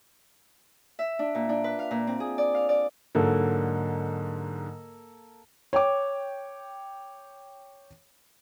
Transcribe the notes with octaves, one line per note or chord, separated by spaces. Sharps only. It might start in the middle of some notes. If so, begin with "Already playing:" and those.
E5
D4
A#2
D4
B4
F5
A#2
C4
G#4
D5
F5
D5
G#2 D3 F#3 A#3 A4
C#5 G5 D6